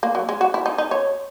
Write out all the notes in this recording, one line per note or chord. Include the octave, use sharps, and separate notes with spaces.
A#3
F#3
G#3
F#4
E4
D#4
D#4
C#5